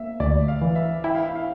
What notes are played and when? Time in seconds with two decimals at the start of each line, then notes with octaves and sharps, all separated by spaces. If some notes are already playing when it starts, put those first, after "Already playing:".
Already playing: A#3 E5
0.20 D2 D5
0.48 F5
0.61 E3
0.75 E5
1.04 E4 G5
1.15 F5
1.25 E5
1.35 F5